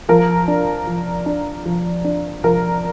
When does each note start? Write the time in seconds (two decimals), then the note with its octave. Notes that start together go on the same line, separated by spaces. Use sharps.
0.09 F3 A#4
0.48 D4
0.87 F3
1.26 D4
1.65 F3
2.04 D4
2.44 F3 A#4